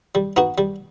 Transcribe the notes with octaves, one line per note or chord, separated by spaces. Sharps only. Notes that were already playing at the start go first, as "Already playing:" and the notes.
G3
B3 D#4 F#4
G3